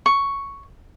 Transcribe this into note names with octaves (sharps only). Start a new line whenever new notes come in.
C#6